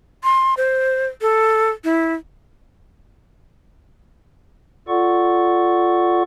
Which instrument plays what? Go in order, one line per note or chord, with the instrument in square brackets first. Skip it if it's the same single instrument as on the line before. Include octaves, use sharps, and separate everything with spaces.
[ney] C6
C5
A4
E4
[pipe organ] F4 A4 D5 F#5 C#6